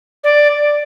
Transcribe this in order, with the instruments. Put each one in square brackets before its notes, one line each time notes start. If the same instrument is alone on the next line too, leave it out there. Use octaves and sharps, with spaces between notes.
[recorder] D5